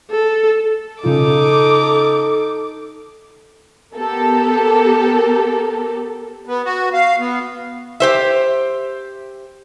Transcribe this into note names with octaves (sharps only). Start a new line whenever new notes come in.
A4
C#3 D#4 F4 A4 D6
B3 G4 A4 A#4
B3
F#4
F5
B3
G4 C5 E5